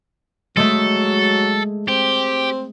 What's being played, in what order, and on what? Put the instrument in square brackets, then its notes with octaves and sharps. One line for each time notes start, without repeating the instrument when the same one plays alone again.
[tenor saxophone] F#3 [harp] G#3 A3 [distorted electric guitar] A4
[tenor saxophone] C4 [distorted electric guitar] G4